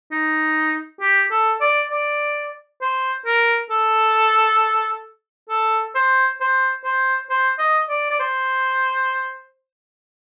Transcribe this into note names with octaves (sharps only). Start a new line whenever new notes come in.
D#4
G4
A4
D5
D5
C5
A#4
A4
A4
C5
C5
C5
C5
D#5
D5
D5
C5